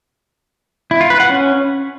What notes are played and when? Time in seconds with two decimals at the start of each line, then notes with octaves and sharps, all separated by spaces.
0.91 E4
1.01 F4
1.10 B4
1.20 F#5
1.29 C#4